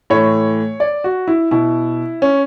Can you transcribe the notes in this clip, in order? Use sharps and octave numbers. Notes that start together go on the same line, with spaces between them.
A2 E3 C#5
D5
F#4
E4
B2 E4
C#4